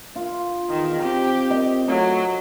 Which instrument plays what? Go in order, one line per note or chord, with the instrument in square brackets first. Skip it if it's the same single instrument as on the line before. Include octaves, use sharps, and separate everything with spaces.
[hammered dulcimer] F4
[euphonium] E2 [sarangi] D#3
[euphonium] C4 [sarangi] G4
[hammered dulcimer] D#5
[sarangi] F#3 [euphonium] A3 [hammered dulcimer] C#6